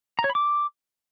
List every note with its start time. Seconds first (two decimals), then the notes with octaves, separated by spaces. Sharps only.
0.19 A#5
0.24 C#5
0.30 B5
0.35 D6